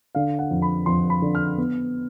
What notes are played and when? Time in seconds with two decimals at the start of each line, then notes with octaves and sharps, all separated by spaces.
0.15 D3 F5
0.39 F#5
0.51 F2
0.62 B5
0.86 F2 C6
1.10 B5
1.22 D3
1.35 F6
1.58 B3